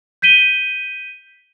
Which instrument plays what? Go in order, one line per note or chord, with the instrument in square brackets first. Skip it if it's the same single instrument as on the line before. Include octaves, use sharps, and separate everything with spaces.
[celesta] G6 B6 D#7 G7